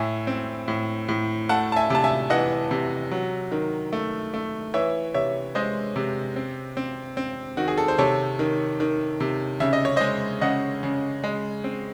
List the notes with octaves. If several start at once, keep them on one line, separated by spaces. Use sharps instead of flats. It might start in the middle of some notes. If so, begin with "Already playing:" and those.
Already playing: A2 E5 G#5
C4
A2
A2
A3 F#5 A5
A5
E5 G#5
C3 A5
E5 G#5
E3 D#5 F#5
C3
F#3
D#3
A3
A3
E3 C#5 E5
C3 C#5 E5
G#3 C5 D#5
C3
C4
C4
C4
D#3 F#4
G#4
A4
C5
C3 A4 C#5
D#3
D#3
C3
C#3 E5
D#5
C#5
G#3 C5 D#5
C#3 D#5 F#5
C#3
G#3
C4